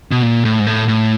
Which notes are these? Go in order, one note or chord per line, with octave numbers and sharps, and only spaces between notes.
B2
A#2
A2
G#2
A2
A2